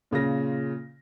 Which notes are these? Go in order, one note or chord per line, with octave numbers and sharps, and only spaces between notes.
A#2 C#3 F4 A#6